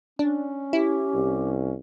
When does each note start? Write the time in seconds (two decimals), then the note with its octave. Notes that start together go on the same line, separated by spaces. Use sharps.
0.19 C#4 D4
0.73 E4 G4
1.14 C2